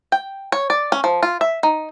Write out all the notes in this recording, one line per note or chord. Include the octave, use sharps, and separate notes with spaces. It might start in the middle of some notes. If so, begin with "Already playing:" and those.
G5
C#5
D5
C#4
F3
F4
E5
D#4